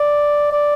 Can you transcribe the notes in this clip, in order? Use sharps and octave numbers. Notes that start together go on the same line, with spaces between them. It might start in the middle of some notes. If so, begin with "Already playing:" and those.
Already playing: D5
D5